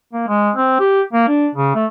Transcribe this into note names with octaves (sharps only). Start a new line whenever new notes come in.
A#3
G#3
C4
G4
A#3
D4
C#3
A3